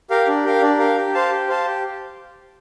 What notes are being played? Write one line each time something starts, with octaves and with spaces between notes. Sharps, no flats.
G4 A#4 F5
D4
G4 A#4 F5
D4
G4 A#4 F5
G4
C5 F5 A5
G4
C5 F5 A5
G4